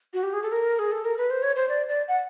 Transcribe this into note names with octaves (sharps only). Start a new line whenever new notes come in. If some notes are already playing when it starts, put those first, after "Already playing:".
F#4
G4
G#4
A4
A#4
G#4
A4
A#4
B4
C5
C#5
C5
D5
D5
F#5